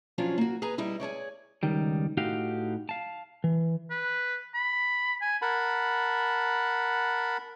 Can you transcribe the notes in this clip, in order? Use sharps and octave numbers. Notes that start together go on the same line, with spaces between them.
F3 F#3 C#4 D4 F4
A#3 F#4
G#4 B4 G#5 A#5
G3 D#4 E4
G#4 A4 C#5 D5
C#2 D#3 G3
A2 D#4 F#4 G4 F5
F5 A5
E3
B4
B5
G#5
A#4 F#5 A5 B5